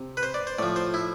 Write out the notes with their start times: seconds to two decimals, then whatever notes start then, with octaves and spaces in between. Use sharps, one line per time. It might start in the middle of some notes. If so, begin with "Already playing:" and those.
Already playing: C3
0.17 B4
0.23 C5
0.34 D5
0.47 C5
0.59 A2 F3 D5
0.76 C5
0.94 E4